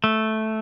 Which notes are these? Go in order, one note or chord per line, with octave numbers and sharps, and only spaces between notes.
A3